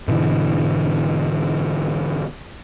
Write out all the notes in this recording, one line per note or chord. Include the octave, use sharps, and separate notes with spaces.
G#2 B2 D3 E3